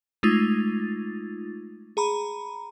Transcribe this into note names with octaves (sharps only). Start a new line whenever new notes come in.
G#3 A3 D#4 F4 A6
G#4 A#5 B5